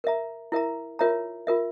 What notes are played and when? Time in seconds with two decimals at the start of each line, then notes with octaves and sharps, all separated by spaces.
0.04 A#4 E5 A#5
0.52 E4 A#4 E5 A#5
0.99 F4 A#4 C#5 E5 A#5
1.47 F4 A#4 E5